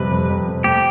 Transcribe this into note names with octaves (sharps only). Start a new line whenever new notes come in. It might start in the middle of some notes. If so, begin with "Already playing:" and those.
Already playing: F2 C3 G3 B4
F2
F2
C3
A3 G4